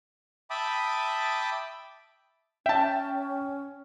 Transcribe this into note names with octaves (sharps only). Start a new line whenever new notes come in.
E5 G5 A5 B5 D6 D#6
C#4 E5 G5 A5